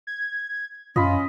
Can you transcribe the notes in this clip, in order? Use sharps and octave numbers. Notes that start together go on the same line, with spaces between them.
G#6
F#2 C#4 F4 D#5 B5